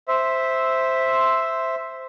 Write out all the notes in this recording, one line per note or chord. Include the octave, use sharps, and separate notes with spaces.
C5 E5